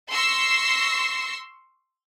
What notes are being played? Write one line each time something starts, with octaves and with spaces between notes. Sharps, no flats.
C6 C#6 E6 A#6 C7